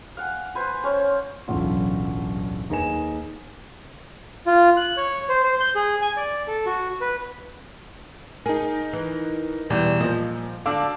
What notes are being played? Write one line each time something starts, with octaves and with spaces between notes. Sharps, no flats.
F5 F#5 G#5
B4 C5 G#5
C#4 C5
D1 B1 E2 C#4 F4
D#2 D#4 G#4 B4 G#5 E7
F4
F#6
C#5
C5
C5
G6
G#4
G#5
D5
A4
F#4
B4
D#4 G#4 A#4
E3
E2 B2 G3 G4
A#2 F3 D#5
D3 D4 F#4 F5 D6 E6